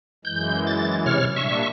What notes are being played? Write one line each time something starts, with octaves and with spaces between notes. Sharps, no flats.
F#2 E3 G#3 G6
A6
C3 C#5 F6
A#2 G3 D4 E5 C#6